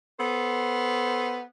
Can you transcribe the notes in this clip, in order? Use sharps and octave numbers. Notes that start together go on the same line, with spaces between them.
B3 A4 C5